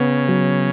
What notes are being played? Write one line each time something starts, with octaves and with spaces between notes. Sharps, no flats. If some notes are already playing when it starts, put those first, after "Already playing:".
Already playing: C#3 B3
F#3